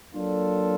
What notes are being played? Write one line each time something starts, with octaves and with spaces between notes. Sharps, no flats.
F#3 A#3 D4 F4 A4